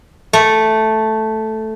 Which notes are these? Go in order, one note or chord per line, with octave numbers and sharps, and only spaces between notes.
A3